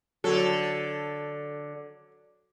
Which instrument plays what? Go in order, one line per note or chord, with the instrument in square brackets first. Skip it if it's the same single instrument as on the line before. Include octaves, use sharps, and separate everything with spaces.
[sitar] D3 A4 [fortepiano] F#3